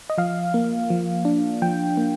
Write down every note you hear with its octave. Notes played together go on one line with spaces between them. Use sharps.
D#5
F3 F5
A#3
F3
D4
F3 G5
A#3